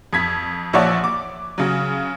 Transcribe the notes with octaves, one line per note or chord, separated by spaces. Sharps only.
F2 G#6 B6
A#1 F3 C#5 D5 E5 F#5
D6
C#3 F#3